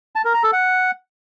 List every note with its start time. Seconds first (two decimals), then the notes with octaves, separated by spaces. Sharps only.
0.15 A5
0.25 A#4
0.34 A#5
0.43 A4
0.53 F#5